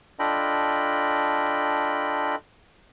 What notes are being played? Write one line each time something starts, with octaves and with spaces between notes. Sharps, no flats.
D4 F4 A4 D#5 G5 B5